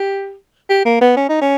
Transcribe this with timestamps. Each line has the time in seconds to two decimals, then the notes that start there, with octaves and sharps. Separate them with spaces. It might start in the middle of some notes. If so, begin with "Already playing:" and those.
Already playing: G4
0.69 G4
0.85 A#3
1.01 B3
1.17 C#4
1.29 D#4
1.41 C#4